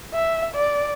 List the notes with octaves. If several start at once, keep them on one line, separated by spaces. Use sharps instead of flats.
E5
D5